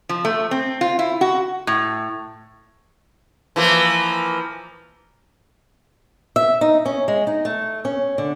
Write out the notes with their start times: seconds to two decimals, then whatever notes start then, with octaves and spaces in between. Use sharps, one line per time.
0.09 F3
0.25 A3
0.51 C4
0.81 F4
0.99 E4
1.21 F#4
1.67 A2
3.56 E3 F3 A#3
6.36 E5
6.61 D#4
6.85 C#4
7.08 G#3
7.27 D#4
7.45 A3
7.85 C#4
8.18 D3